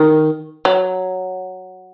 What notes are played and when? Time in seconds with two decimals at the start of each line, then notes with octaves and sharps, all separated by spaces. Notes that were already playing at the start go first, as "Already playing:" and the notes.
Already playing: D#3
0.65 F#3